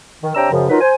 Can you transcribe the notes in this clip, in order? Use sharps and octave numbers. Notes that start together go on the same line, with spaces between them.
D#3
C3 D4 C#5 G5 A#5 E6
F#2 C#3 F3
D#3 F#3 D#4 F4 A#4 B4
C5 G#5